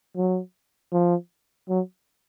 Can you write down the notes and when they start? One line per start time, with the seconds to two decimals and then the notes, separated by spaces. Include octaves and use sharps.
0.17 F#3
0.92 F3
1.69 F#3